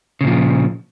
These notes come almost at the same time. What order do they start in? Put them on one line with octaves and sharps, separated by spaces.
C#3 A#2 F3